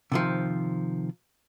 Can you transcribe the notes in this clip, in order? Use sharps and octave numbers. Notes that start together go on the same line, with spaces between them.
C3 D#3 F3